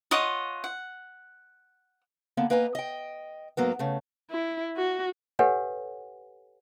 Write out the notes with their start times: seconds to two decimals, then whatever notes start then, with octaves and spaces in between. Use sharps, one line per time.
0.11 F4 C#5 D#5 F#5
0.64 F#5
2.37 D3 A#3 B3
2.50 A#3 B4 D#5 G#5 A#5
2.75 D#5 G5
3.57 G#2 F#3 A#3 B3
3.79 C#3 A3
4.30 E4
4.77 F#4
5.39 G4 A4 B4 C#5 F#5 G#5